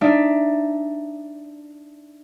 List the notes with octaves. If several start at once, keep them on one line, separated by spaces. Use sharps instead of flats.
D4 D#4 D5 E5